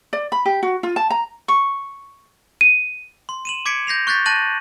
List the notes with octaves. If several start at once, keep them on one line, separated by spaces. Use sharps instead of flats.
D5
B5
G4
F#4
F4
A5
A#5
C#6
D#7
C6
D#7 E7 F#7
D6 G#6 B6 C#7 D7
G6 A#6 C7 F7
C#6 F#6 G6 A6 B6
A5 F#6 A6 A#6 D#7 F#7